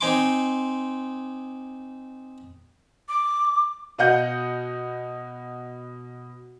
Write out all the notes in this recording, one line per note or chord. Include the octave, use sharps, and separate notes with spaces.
C4 D#4 G#5 C6 D6
D6
B2 D#5 F#5 G6